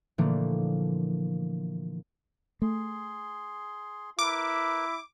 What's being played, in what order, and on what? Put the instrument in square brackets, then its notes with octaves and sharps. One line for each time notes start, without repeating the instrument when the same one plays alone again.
[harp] A#2 D3 E3 F3 A3 A#3
[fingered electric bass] A3 [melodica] G#4 C6
[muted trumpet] E4 [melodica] A#4 B4 [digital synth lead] D6